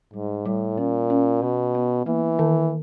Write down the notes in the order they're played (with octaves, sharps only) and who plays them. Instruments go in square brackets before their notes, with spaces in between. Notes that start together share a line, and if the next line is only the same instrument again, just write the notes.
[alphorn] G#2 [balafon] G3
[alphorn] A2 [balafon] G3
[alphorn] A#2 [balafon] C#4
[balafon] C#4
[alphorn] B2 [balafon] B3
[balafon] B3
[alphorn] E3 [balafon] A#3
[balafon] D#3